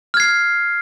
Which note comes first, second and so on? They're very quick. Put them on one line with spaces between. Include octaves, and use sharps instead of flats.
F6 G#6 C7